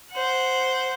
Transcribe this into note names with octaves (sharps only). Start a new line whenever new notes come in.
C5 F#5